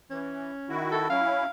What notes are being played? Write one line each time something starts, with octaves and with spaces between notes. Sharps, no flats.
E3 C#4
D#3 E4 F#4
A4
F#3 C#4 E4 F5